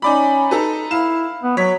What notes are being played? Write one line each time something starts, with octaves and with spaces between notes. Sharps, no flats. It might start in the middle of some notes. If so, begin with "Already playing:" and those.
C#4 D#4 D5 B5
D#4 A4 B4
E4 F5 E7
B3
F#3 C#5 B6